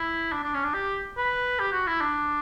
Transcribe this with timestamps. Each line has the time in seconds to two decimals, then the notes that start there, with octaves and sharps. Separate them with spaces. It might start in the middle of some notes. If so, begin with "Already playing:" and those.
Already playing: E4
0.32 D4
0.43 D4
0.54 C#4
0.64 D4
0.74 G4
1.17 B4
1.59 G4
1.73 F#4
1.87 E4
2.01 D4